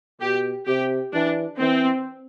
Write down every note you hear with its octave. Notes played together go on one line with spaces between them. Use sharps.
B2 G4
C3 G4
E3 D4
E3 C4